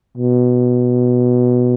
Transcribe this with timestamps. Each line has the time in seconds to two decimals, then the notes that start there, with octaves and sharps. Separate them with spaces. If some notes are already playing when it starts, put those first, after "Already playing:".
0.17 B2